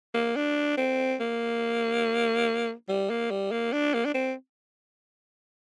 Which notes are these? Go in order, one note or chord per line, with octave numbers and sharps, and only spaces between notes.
A#3
D4
C4
A#3
G3
A#3
G3
A#3
D4
A#3
D4
C4